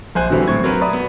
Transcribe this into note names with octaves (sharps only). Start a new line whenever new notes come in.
A#1 C5 G#5 F#6
B2 D3 E3 F#3 G3 C4
A2 C4 C#6 G#6
F#3 C4 A#4 B4
D5 E5 A#5 B5 D#6
B3